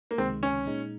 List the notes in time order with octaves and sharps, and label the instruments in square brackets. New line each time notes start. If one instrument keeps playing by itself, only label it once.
[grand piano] A#3
[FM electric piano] C#2 C3 D#3 G#3 [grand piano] C4
[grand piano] C#4
[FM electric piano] A#2 G#3 D#4